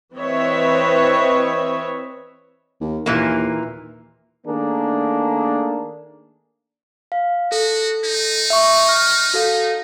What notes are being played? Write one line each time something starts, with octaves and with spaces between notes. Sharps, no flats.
E3 C4 B4 C#5 D#5 E5
D#2
D#2 A#2 E3 A#3
D#3 A3 A#3 D4 G#4 A#4
F5
F#4 A4
D#4
E5 C#6
F6
F#4 A4 F5